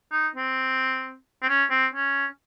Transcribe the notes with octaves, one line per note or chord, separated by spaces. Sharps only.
D#4
C4
C4
C#4
C4
C#4